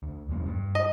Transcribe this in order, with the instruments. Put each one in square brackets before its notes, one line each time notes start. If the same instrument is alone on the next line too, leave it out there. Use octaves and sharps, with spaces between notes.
[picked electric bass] D2
E1 F#2 A#3
G2
[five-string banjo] D#5